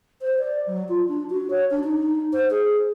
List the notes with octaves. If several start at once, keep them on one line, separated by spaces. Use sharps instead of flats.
C5
D5
F#3
F4
D4
F#4
C#5
D4
D#4
C5
G#4